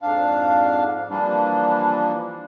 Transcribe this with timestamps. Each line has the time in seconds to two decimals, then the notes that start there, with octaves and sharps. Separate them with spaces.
0.02 F2 G#2 D4 F5
1.10 E3 F3 G3 A#3 D4